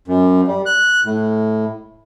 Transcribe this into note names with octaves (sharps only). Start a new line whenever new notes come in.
F#2
G3
F#6
A2